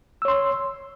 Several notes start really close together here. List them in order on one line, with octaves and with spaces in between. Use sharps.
E6 C#5 C6